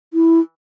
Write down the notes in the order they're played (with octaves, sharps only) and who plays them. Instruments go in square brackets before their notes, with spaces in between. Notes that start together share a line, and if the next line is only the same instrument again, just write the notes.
[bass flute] E4